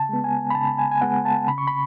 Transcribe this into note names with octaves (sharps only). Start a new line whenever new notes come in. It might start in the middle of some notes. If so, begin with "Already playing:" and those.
Already playing: C#3 A5
G#3 B3
G#5
B5
C#3 A5
G#5
G#5
G#3 B3 F#5
A5
C#3 B5
C#6
B5